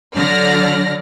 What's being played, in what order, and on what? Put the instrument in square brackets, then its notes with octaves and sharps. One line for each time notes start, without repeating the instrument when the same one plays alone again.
[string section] D3 F#3 D5 F6 A#6